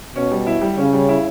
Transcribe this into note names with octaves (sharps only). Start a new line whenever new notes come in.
B2 C#4
G3
E4
G3
C#3 C#4
G3
E4